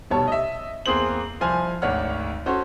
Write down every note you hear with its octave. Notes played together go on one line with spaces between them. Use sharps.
F1 B2 G3 C#5 A5
D#5 E5
E2 A#3 C4 G#4 C5 F#7
C2 F3 C5 G#5 F6
G#1 D2 D4 C#5 F#5 F6
C#4 F#4 A4 C5 C#5